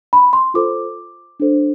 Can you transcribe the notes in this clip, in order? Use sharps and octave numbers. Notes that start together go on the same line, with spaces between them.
B5
C6
F4 A4 C5 D6
D4 A4 C5